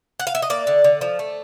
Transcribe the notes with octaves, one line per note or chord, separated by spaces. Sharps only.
F#5
F5
E5
D#5
A#3 D5
D3
D3
F3
A3